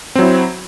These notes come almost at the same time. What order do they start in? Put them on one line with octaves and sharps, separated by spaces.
C4 F#3 E4